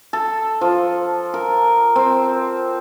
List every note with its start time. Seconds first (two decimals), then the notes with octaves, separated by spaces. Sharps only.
0.13 A4
0.61 F3
1.34 A#4
1.96 C4